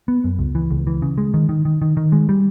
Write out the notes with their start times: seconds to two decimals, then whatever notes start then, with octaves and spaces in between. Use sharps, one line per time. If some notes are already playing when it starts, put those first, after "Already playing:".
0.08 B3
0.24 F#2
0.39 C#2
0.55 E3
0.71 C#2
0.87 E3
1.02 C#3
1.18 G#3
1.34 D#3
1.49 D#3
1.65 D#3
1.82 D#3
1.97 D#3
2.12 G#3
2.29 G3